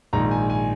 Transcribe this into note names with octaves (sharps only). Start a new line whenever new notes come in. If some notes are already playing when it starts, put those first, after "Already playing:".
A#1 G#2 D#3 A#5
G#5
G#5